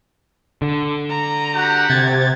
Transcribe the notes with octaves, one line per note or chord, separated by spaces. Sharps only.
D3
A#5
F#4 G4 F#5
C3 G#6 A6